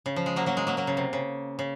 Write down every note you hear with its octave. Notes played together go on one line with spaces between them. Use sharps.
C#3
F3
G#3
F#3 A#3
F#3 A#3
G#3
F#3 A#3
F#3 A#3
C#3
C3
C#3
C#3